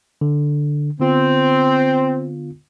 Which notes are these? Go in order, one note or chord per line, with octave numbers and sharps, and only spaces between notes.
D3
D3 B3 C4 F4